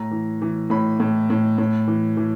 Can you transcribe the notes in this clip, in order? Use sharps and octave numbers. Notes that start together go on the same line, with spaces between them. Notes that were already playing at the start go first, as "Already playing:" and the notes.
Already playing: A2 A#5
E3
E3
A2 B5
A2
A2
A2
E3
E3